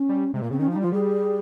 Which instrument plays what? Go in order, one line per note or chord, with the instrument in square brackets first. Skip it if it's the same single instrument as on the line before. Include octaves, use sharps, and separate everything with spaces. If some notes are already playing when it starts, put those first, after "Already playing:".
Already playing: [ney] C#4
[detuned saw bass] G3
[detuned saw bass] C3 [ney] G#3
[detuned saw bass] A#2 [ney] A#3
[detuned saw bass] C#3 [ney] C4
[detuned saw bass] D#3 [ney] C#4
[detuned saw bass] F3
[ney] D#4
[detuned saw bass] G3
[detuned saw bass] F3 [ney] F4
[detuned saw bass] G3 [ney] G#4